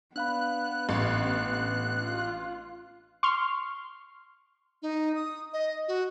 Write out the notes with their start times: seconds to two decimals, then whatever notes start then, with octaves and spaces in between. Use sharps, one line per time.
0.16 B3 D4 F5 B5 F#6
0.89 A1
2.00 F4
3.23 C6 C#6 F6
4.82 D#4
5.15 D#6
5.53 D#5
5.88 F#4